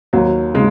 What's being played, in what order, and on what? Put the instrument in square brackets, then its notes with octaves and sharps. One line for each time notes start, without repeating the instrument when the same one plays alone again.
[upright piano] D#2 F#3
C#3 G#3